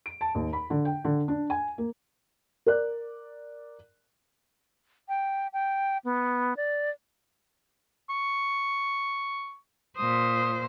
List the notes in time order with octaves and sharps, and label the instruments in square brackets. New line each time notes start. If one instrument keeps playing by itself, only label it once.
[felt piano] D7
A5
D#2
B5
D3
G5
D3
D4
G#5
A#3
A#4 D5 F#6
[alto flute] G5
G5
B3
D5
[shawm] C#6
[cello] A#2 C5 [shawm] D#6